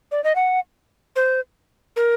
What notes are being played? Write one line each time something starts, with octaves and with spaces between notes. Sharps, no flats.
D5
D#5
F#5
C5
A#4